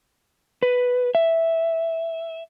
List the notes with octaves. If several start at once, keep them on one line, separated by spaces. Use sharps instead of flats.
B4
E5